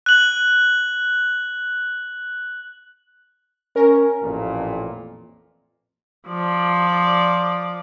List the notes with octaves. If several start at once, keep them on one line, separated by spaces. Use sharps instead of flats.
F#6 F#7
C#4 A#4
A1 F2 A#2
F3 D5